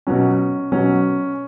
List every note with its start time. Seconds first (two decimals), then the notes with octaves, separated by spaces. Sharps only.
0.07 B2 F#3 C#4
0.72 B2 F#3 C#4